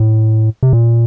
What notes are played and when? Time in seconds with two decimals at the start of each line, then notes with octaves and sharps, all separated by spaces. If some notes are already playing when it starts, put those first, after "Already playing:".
Already playing: A2
0.63 C3
0.73 A#2